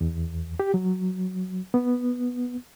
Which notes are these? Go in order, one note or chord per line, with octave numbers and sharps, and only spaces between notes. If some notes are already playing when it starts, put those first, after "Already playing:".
E2
G4
F#3
B3